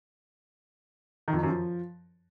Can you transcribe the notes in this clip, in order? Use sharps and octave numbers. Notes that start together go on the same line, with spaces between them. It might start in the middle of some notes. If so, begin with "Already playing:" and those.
D#3
F2
D#3
F#2
F3